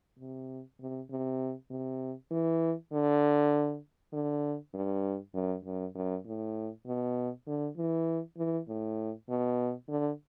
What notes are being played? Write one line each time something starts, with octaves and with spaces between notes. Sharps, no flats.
C3
C3
C3
C3
E3
D3
D3
G2
F#2
F#2
F#2
A2
B2
D3
E3
E3
A2
B2
D3